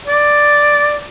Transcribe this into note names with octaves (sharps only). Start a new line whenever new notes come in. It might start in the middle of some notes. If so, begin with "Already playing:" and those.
D5